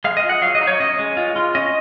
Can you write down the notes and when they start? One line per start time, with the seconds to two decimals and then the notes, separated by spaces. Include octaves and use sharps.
0.04 G#3 F5
0.17 D#5
0.24 F4
0.29 F#5
0.42 F#3 F5
0.55 D#5
0.61 D#4
0.67 C#5
0.80 C#4 D#5
0.99 G#3
1.17 F4
1.36 F4
1.55 C#4 D#5